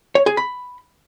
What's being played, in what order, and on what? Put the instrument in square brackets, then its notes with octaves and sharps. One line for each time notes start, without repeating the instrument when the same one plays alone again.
[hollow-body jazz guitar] C#5
G#4
B5